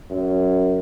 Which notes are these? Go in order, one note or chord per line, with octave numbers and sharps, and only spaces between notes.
F#2